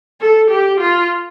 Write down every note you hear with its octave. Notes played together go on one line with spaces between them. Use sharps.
A4
G4
F4